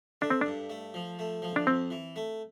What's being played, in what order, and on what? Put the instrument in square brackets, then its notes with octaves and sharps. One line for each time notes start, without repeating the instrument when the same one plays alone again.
[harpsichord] A3 [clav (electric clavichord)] D4
[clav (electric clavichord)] C4
[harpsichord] G2 [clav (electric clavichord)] D4
[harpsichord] A3
F3
A3
F3
[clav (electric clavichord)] D4
[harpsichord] F2 [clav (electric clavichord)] C4
[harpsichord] E3
A3